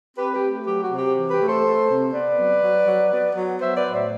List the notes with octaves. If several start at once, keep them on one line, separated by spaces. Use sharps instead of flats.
C4 G4 B4
G4 B4
A3
F#3 G4
F#4
C3
G4
E3
G4 B4
A3
A4 C5
A3
C3
B3 B4 D5
F#3
F#3
F#3
B3
F#3
F#3 C5 E5
B4 D5
A2
C5 E5